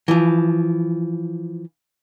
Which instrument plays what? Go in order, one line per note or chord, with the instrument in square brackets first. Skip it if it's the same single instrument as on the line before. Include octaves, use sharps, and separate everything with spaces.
[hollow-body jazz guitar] E3 F3